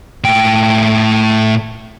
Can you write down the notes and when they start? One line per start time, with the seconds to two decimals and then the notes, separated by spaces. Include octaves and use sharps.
0.24 A2 G5